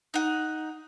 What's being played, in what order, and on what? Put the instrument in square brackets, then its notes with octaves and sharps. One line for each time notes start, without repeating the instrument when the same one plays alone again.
[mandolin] D#4 F#5